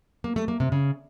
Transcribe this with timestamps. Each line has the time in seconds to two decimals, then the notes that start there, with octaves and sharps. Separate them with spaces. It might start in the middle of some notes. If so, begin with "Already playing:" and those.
0.24 A#3
0.36 A3
0.48 A#3
0.60 C3
0.72 C#3